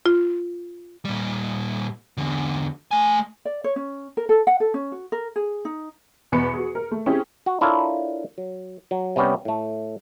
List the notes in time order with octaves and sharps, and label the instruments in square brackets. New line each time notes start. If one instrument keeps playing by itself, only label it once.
[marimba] F4
[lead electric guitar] A#2 G3
E2 D3
A3 G#5
[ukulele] D5
C#5
C#4
A#4
A4
F#5
A4
C#4
F#4
A#4
G#4
D#4
[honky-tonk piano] E2 B2 B3 B5 C#7
F#4 G#4
A#4
A3
C4 C#4 E4 G4 G#4
[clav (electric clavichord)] F#4
D4 E4 F4 A4 A#4 C#5
F#3
F#3
C3 G3 B3 C#4 G4
A2 A3